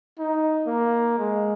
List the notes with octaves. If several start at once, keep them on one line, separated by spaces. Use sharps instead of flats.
D#4
A#3
G#3